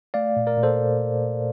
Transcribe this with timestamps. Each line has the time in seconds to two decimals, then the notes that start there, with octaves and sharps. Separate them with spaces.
0.14 A3 D5 F5
0.36 A#2
0.47 A#4 D5
0.57 A#2
0.63 A4 C5